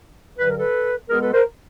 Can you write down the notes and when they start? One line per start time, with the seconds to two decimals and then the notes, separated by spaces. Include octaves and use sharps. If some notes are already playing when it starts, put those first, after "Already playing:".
0.38 G2 D3 F#3 B4
0.48 A#4
0.57 A4 B4
1.09 B2 G#3 B3 G#4 A#4
1.21 A4 B4
1.33 A#4 C5